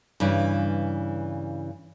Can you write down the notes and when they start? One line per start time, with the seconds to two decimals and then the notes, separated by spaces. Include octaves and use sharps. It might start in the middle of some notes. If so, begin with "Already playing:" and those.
0.20 G2 C#3 E3